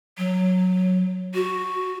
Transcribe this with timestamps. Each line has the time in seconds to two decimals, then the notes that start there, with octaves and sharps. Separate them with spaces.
0.18 F#3
1.35 F#4